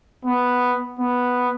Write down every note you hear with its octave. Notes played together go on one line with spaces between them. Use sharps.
B3
B3